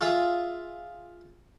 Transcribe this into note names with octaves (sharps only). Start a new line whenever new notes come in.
F4 G#4 E5